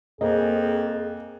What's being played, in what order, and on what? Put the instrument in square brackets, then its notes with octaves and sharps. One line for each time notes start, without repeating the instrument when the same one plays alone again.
[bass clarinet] F2 [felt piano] A#3 C5 [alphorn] G#4 [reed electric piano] D#5